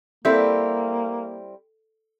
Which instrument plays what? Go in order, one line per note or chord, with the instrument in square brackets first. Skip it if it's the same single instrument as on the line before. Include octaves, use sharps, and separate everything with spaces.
[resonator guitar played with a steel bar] G3 C4 E4 [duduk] A#3 [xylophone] A4 E5 G6